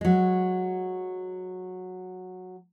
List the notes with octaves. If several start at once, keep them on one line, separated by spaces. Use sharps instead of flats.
F#3 G#3